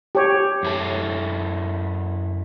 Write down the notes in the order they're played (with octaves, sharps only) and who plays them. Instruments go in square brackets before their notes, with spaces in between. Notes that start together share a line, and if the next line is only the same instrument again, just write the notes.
[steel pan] G4 C#5
[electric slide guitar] F#2 E4 A4